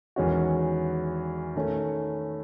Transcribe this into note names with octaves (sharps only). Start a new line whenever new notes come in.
E2 D#3 G#3 C#4 F#4
D#3 A3 C#4